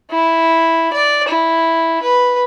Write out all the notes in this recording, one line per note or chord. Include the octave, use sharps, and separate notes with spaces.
E4
D5
E4
B4